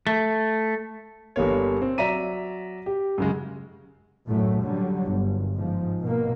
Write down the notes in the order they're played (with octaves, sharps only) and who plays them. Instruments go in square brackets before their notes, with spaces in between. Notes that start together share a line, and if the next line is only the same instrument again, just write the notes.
[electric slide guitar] A3
[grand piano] G1 G3 A#3 C#5
C4
F#3 D5 E5 A#5 B6 D#7
G4
F#2 C#3 G#3
[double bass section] F#2 A2 F#3 A3
D3 F#3 G3
G1
G#2 F3
B2 A#3